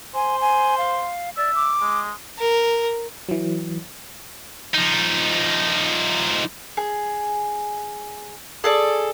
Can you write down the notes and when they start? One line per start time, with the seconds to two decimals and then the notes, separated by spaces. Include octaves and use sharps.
0.15 C5 G#5
0.41 G#5
0.78 F5
1.37 D5 E5
1.55 D6
1.81 G#3
2.39 A#4
3.29 E3 F#3
4.74 F3 D#4
6.77 G#4
8.64 G#4 A4 D5